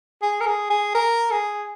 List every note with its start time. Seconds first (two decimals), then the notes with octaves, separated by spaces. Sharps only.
0.22 G#4
0.40 A#4
0.46 G#4
0.70 G#4
0.95 A#4
1.31 G#4